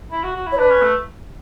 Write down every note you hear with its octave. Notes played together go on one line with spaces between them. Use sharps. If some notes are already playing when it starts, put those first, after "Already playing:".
E4
F#4
F#4
E4
C#5
D4 B4
C#4
A3